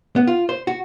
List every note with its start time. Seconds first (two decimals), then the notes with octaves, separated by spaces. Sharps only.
0.16 B3
0.27 F4
0.49 C5
0.67 F#4